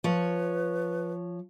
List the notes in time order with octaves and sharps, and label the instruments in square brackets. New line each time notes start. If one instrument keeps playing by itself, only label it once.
[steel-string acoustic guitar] F3 C#5 [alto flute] B4